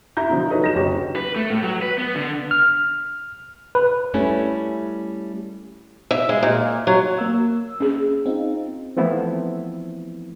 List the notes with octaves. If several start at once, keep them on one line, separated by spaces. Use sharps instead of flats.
E4 A#5 G6
B2 D3 F3 F#3
D#4 G#4 A4 B4 C#5 D#5
F#3 A#6 E7
F#1 D2 F#3 C#4 G4 C#5
B4
A3
A2
F#3
B4
B3
D3
F6
B4
G3 A3 C#4 E4
E5
G#3
A#2
F#3
A#3 E6
C#4 G#4
C4 D#4 F4
E3 F3 A3 B3 C4 E4